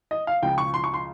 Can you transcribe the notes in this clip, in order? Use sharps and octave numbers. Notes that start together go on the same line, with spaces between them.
D#5
F5
C#2 C#3 F3 G5
C#6
C6
C#6
C6